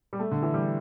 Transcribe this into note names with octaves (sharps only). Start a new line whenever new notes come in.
G3
A3
D3
E3
G3